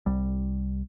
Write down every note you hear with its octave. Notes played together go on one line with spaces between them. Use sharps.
C2 G3